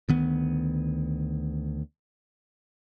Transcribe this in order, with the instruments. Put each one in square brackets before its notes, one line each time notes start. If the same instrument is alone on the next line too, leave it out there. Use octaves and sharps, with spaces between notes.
[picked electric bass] D2 D#3 B3